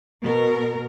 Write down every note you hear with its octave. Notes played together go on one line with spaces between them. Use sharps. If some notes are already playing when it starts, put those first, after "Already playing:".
B2 A#4